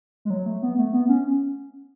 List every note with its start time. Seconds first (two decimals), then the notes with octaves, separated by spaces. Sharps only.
0.25 G#3
0.30 F#3
0.46 A3
0.63 B3
0.78 A3
0.94 B3
1.09 C#4